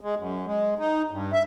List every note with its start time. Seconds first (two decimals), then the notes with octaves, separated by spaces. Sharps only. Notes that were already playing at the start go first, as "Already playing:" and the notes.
0.01 G#3
0.17 F#2
0.46 G#3
0.79 D#4
1.11 G2
1.32 E5